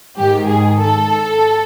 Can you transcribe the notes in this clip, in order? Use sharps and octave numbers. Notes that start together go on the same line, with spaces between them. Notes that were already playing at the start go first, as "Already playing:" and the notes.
G#2 D#3 G4
G#4
A4